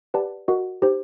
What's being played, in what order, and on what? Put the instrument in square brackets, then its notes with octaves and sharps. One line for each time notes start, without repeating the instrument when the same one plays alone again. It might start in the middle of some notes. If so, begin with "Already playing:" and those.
[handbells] G4 B4 D5 F#5 A5
F#4 A#4 D#5 F#5
D#4 G4 C5